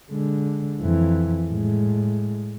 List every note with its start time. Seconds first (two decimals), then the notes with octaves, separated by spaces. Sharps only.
0.11 D3 G#3
0.81 F2 E3
1.48 A2 G#3